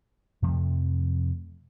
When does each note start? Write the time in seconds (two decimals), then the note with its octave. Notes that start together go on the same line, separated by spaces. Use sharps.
0.42 F2 C3 F3 A3